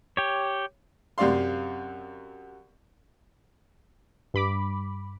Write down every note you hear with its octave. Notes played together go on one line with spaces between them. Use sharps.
G4 C#5
F#2 C3 D5 F5 C6
G2 B5 D6